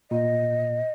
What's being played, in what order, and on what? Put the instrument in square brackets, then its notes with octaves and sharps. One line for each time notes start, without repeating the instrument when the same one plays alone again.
[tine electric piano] A#2 [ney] D#5